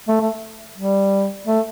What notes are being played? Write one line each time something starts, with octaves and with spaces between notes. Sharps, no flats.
A3
A3
G3
A3